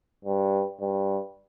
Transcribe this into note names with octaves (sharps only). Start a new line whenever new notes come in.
G2
G2